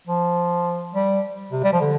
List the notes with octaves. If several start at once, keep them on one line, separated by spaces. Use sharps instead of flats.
F3
G3
C3
G3
F3
D3